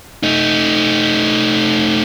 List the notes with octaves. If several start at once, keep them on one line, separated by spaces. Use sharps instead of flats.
A3 D#4